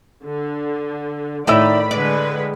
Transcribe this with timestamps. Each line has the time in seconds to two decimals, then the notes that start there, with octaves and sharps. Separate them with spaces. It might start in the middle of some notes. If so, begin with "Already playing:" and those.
0.25 D3
1.47 A2 D#3 D#4 E4 D5 B5 E6
1.91 D3 G#3 B4 D5